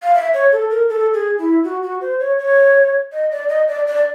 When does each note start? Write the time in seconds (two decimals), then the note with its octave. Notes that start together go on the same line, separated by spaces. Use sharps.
0.03 F5
0.15 E5
0.34 C#5
0.52 A4
0.70 A#4
0.89 A4
1.13 G#4
1.39 E4
1.64 F#4
1.82 F#4
2.01 C5
2.20 C#5
2.39 C#5
3.13 D#5
3.32 D5
3.49 D#5
3.68 D5
3.87 D5